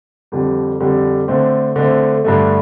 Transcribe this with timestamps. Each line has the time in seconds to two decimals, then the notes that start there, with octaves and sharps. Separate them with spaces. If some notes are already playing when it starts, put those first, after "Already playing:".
0.32 F2 D3 G3
0.80 F2 D3 G3
1.28 D3 A3 C4
1.76 D3 A3 C4
2.24 G2 D3 A3